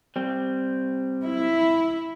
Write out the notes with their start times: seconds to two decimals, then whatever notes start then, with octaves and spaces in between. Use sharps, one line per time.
0.16 G3 C4
1.25 E4